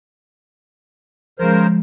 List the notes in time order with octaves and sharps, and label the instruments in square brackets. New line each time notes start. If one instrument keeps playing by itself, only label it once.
[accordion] C#3 A#4 C5 [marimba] F3 G#3